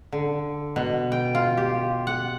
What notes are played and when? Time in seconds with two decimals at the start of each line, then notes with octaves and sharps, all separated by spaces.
0.12 D3
0.76 B2
1.12 G5
1.35 F4
1.57 G4
2.07 F#5